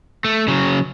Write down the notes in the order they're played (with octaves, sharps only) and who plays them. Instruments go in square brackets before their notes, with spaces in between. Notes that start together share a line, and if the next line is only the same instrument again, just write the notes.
[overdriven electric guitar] A3
C#3 F#3